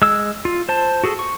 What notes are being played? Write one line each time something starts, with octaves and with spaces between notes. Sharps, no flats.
G#3 E6
F4
C5 A5
F#4 G#4 A4
C#6